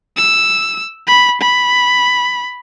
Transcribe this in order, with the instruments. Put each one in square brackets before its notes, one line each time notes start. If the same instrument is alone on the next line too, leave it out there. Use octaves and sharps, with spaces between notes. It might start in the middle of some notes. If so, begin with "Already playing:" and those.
[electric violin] E6
B5
B5